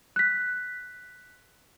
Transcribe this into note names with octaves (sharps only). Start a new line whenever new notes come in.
F#6 B6